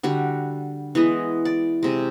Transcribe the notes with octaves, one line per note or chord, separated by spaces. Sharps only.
D3 G3 F#4
E3 G#3 B3 D#5
D5
C3 G#3